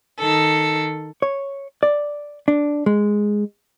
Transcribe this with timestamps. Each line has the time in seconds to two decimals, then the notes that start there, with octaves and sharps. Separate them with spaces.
0.19 D#3 A4
1.22 C#5
1.83 D5
2.48 D4
2.86 G#3